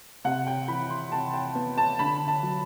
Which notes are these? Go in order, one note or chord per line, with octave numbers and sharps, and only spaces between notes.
C3 F#5
G5
E3 B5
C6
C3 A5
G5
B3
A5
D3 B5
A5
F#3